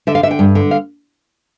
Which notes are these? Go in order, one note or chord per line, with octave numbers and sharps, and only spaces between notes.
D3 E5
F5
D3 E5
G5
G2
D3
F5